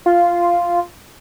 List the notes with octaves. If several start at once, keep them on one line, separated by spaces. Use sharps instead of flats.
F4